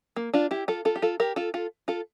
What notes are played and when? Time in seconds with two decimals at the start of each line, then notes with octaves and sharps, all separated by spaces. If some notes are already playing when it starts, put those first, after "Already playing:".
0.16 A#3
0.34 D4 F4
0.51 E4 G4
0.68 F4 A4
0.85 F4 A4
0.96 G4
1.02 F4 A4
1.20 G4 A#4
1.36 F4 A4
1.54 F4 A4
1.88 F4 A4